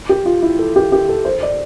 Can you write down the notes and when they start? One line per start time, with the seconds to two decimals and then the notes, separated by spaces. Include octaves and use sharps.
0.09 G4
0.26 F4
0.42 E4
0.59 A4
0.76 G4
0.92 G4
1.09 A4
1.25 C5
1.43 D5